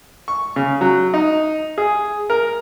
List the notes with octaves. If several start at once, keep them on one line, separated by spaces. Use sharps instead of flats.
C#6
C#3
F#3
D#4
G#4
A#4